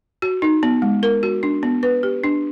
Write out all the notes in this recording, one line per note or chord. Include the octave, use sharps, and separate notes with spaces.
F#4
D#4
B3
G#3
A#4
F#4
D4
B3
B4
G4
D4